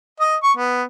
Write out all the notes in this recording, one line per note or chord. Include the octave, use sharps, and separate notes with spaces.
D#5
C#6
B3